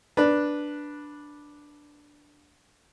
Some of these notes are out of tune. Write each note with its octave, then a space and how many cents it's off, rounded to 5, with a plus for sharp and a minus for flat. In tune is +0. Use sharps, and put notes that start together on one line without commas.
D4 +0 B4 -10